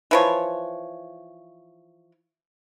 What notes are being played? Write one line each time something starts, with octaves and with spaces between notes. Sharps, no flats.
E3 F3 C#5